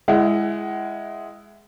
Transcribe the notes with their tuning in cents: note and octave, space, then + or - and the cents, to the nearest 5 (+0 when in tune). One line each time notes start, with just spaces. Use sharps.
G#3 +0 E4 +15 F#5 +30